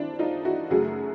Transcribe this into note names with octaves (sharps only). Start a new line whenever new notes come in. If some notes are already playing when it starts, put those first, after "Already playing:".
Already playing: G2 D#3 C4 D4 E4
D#4 F4
E4 F#4
F#2 C#3 F#3 A3 F#4 G#4